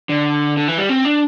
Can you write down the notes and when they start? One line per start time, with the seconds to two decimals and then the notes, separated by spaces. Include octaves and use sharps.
0.09 D3
0.57 D3
0.68 E3
0.78 G3
0.89 C4
1.05 D4